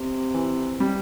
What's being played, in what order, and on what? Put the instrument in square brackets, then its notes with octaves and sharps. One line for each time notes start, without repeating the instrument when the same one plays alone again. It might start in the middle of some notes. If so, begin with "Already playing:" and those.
Already playing: [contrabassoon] C3
[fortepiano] E3
G3